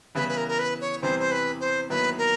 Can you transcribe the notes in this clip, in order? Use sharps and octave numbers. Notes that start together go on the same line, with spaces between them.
C#3 E3 G3 B3 E4 B4
B4
A#4
A#4
B4
C#5
E2 C3 E3 G3 C4 C5
C5
B4
C5
D#2 D#3 F#3 B3 E4 B4
A#4